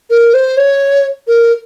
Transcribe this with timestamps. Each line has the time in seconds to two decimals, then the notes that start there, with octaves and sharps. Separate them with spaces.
0.10 A#4
0.34 C5
0.57 C#5
1.28 A#4